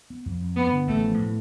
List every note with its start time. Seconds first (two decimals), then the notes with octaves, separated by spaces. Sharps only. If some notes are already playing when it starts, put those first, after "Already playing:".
0.10 B3
0.26 F2
0.41 F2
0.56 G2 B3
0.72 D3
0.87 A1 A3
1.02 F3
1.19 A2